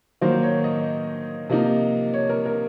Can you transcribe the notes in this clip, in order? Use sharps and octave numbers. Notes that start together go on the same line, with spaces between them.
D#3 F#3 A#3 C5
C#5
D#5
C3 F3 A#3 D#4
C#5
A#4
A#4